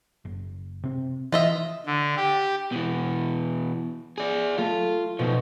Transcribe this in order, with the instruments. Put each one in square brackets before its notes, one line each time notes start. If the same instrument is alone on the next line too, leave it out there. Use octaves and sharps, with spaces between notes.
[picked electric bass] F#1
C3 C4
[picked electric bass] E3 [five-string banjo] F4 D#5 E5
[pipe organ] D3
G4
[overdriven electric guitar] B2 E3
G#4 D5
[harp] A3 [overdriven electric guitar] F4
[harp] B2 [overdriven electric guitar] F3 D#4